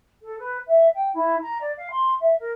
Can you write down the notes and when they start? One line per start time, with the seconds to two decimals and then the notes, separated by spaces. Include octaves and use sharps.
0.22 A4
0.39 B4
0.67 E5
0.94 G5
1.14 E4
1.42 A#5
1.60 D5
1.77 F5
1.90 C6
2.20 E5
2.39 A#4